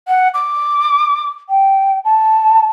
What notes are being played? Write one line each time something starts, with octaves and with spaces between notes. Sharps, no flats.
F#5
D6
G5
A5